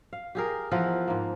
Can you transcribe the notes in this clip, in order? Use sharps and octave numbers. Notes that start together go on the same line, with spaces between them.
F5
G4 G#4 A#4
E3 F3 B3 A#4
G#2 A#3